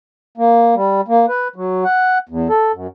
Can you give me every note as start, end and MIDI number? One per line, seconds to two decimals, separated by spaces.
0.38 0.75 58
0.75 1.01 55
1.08 1.26 58
1.29 1.48 71
1.56 1.84 54
1.84 2.18 78
2.29 2.48 40
2.50 2.72 69
2.73 2.87 42